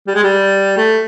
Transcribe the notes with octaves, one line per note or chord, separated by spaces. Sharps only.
G3
G#3
G3
A3